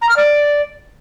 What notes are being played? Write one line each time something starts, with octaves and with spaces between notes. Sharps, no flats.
A#5
F6
D5